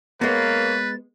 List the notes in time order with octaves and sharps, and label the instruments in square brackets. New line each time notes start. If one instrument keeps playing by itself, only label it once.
[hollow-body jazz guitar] G#3 B3 [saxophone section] A#3 C#5 [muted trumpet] B4 [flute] A6